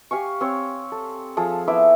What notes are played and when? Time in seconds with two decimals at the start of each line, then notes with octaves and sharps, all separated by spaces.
0.11 G4 F5 G#5 C#6
0.41 C4 C#5
0.92 A4
1.37 F3 G#4 A4
1.68 B3 E4 E5 D6